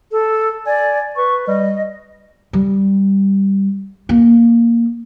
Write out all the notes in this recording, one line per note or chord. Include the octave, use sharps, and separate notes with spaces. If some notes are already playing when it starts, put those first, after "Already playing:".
A4
D5 G#5
B4 C#6
G3 D#5
G3
A#3